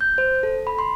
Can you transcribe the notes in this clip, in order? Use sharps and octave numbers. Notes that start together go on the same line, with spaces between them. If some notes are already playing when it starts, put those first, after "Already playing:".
G6
C5
A4
B5
C6